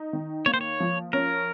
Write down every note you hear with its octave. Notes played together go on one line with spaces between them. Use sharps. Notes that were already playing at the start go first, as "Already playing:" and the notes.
Already playing: D#4
D#3
A#3 C#5
C5
C#5
F3
C#4 A#4